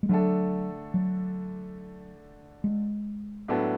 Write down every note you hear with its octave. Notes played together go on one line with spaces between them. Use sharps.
G#3
D3 F#3 A3 D4 A4
F#3
G#3
A2 F#3 B3 D4 A4